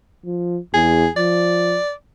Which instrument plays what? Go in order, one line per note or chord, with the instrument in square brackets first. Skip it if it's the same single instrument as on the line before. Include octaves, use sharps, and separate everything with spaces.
[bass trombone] F3
[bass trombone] E2 [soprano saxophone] G#4
[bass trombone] F3 [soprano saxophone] D5